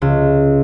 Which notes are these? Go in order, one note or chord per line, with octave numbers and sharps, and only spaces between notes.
C#2